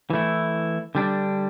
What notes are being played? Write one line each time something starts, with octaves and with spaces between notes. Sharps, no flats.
E3 A3 E4
D3 G3 D4